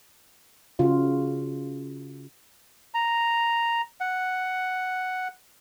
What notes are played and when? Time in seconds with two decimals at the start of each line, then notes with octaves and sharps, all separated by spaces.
0.79 C#3 F4 F#4
2.94 A#5
4.00 F#5